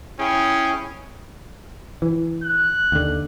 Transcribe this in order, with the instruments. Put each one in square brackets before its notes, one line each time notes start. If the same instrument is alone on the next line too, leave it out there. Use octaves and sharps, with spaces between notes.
[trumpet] C#4 [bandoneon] E4 G#4 G5
[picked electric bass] E3
[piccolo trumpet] F#6
[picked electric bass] D#2 D3